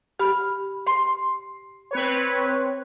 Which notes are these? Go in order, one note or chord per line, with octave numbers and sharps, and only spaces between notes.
G4 B5 F6
C6
C4 B4 C#5